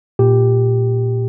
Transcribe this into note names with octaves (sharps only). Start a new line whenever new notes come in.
A#2 G4